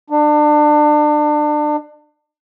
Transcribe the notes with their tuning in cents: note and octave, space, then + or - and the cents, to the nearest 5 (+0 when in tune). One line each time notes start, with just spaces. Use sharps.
D4 +30